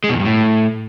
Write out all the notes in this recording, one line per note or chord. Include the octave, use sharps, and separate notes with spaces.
G#3
B2
E2
G2
A2